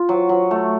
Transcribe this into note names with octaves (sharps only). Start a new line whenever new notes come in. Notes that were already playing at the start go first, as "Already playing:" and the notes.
Already playing: F4
F#3
F#3
A3